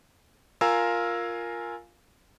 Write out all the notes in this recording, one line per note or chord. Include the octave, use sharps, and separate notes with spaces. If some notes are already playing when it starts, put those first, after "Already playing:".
F4 A#4 F5 G#5 A#5 E6